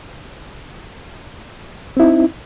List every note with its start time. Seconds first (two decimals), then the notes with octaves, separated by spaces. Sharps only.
1.97 C4
2.00 E4
2.03 D#4